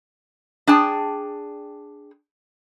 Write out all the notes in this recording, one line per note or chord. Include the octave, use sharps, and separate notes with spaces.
D4 G#4 G5 A5